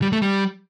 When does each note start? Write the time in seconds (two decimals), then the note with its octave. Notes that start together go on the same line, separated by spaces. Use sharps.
0.02 G3
0.12 A3
0.22 G3